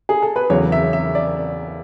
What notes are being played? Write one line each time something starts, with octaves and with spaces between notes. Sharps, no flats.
G#4
A4
B4
E2 C#3 F#3 C#5
E5
E5
D5